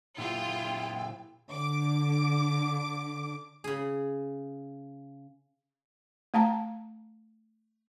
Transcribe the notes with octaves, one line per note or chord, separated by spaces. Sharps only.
A#2 F#3 E4 F4 G4 G5
D3 D6
C#3 G#4
A3 F5 A5 A#5